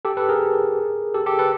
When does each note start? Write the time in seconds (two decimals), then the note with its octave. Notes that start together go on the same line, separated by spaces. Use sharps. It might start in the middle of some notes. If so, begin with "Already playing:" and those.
0.05 G4 A4
0.17 A4 B4
0.29 G#4 A#4
1.14 G4 A4
1.26 G4 A4
1.39 A4 B4